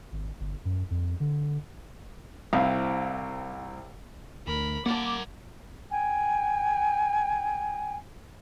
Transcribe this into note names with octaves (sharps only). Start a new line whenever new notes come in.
G#1
G1
F#2
F2
D3
C2 C4 E4 F5
D2 A#4 B5
A#3 A#4 D5 F#5 A5 D6
G5 G#5